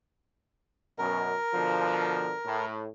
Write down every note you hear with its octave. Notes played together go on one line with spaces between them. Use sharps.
F#2 B2 A#4
B2 D3 F3
A2